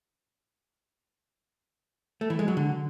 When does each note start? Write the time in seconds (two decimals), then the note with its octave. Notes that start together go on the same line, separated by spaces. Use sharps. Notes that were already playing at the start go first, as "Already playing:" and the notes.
2.21 A3
2.30 E3
2.39 G#3
2.48 F#3
2.57 D3